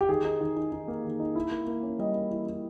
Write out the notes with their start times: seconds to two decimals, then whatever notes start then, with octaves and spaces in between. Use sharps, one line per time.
0.01 G4
0.09 D#3 G#4
0.25 D#4
0.40 D#3
0.56 D#4
0.72 D#4
0.88 A#3
1.04 D#3
1.20 D#4
1.35 E4
1.51 A#3
1.67 A#3
1.83 C#4
1.99 G3 D#5
2.15 A#3
2.31 E4
2.47 E4